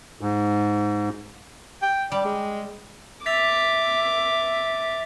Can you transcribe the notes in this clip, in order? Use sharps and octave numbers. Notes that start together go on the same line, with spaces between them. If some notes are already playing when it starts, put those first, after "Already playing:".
G#2
G5
G3 D5
G#3
E5 D6 A6 B6 F7